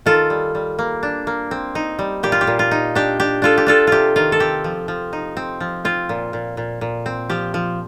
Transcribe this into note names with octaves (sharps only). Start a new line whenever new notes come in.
D#3 F4 A4
G3
G3
A#3
D4
A#3
C4
D#4
G3
A#2 G4
F4
G4
A#2
F4
D#4
D4 G4
D4 G4
D4 F4 A4
G4
D4 F4 A4
C3 F4 G4
D#3 F4
A4
C4 G4
F3
F3
D#4
C4
F3
C4 F4
A#2
A#2
A#2
A#2
C4
F3 G4
F3